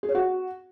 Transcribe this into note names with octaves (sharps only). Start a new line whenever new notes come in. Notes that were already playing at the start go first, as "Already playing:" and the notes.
G#4
C#5
F#4